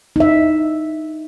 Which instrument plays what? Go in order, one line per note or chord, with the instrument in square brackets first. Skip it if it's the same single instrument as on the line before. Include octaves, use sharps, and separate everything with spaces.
[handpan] D#4 E5